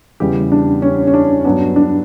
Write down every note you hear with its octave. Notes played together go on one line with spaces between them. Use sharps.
E2 C#3 G3 B3 G4
D4
C#4
C#4
D4
G2 F#3 B3 D4
D4